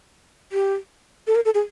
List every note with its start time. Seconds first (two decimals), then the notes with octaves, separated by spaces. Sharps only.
0.52 G4
1.27 A4
1.35 A#4
1.45 A4
1.54 G#4